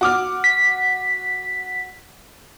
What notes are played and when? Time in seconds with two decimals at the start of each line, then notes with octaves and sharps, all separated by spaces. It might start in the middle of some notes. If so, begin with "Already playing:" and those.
0.01 F#4 D6 F6
0.44 B6